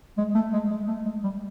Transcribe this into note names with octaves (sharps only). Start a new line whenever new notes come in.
G#3
A3
G#3
G#3
A3
G#3
G3